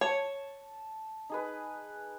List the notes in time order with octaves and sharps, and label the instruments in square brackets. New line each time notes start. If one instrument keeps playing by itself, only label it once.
[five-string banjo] C#5 [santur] A5
[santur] D#4 G#4 B4